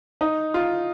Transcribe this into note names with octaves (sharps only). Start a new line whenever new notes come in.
D#4
F4